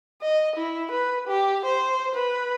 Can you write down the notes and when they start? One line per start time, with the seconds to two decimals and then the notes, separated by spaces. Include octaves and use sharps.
0.22 D#5
0.56 E4
0.91 B4
1.27 G4
1.65 C5
2.15 B4